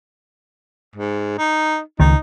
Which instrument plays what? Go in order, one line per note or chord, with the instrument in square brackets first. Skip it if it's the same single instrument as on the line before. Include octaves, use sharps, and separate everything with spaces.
[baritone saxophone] G#2
D#4
[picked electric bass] C#2 D#3 [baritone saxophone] D#4